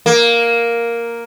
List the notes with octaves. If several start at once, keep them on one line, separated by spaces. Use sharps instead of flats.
A#3